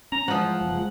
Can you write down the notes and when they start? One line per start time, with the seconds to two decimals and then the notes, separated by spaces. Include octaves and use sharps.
0.12 C#4 A#5
0.28 E3 F3 G#3 D#4 F#5
0.61 F#1 B2
0.74 G#3